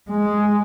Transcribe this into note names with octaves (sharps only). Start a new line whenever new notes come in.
G#3